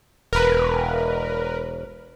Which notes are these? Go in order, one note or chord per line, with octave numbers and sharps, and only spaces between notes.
E1 A#4 B4